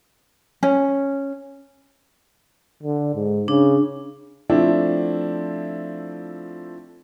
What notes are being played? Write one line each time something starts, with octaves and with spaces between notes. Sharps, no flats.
C#4
D3
G#2
C#3 D4
F3 A3 C4 D4 E4